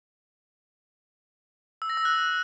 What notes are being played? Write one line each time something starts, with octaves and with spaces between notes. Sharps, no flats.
E6
A#6
E6
F#6